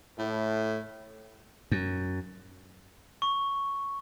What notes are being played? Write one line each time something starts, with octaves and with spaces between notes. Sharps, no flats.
A2
F#2
C#6